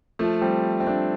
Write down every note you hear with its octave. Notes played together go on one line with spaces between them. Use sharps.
F3 A3
G3 C4
C4
A3 D4